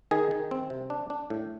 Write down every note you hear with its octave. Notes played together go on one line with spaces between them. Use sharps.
D#3 G#4
D#3
C4
C3
D4
D4
A2